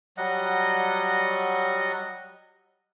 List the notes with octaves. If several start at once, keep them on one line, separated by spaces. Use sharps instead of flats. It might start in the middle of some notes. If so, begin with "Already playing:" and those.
F#3 G3 D#5 F#5